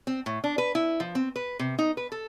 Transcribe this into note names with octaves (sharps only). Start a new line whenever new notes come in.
C4
A2
D4
B4
E4
F3
C4
B4
C3
D#4
B4
A4